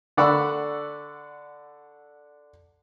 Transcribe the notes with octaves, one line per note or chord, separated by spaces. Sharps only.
D3 D5 F#5 B5 C#6 E6